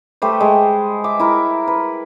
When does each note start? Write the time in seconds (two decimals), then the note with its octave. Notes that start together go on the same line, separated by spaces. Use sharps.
0.22 A3 G4 B4 C5
0.40 G#3
1.04 E5 D6
1.20 E4 A#4
1.68 B4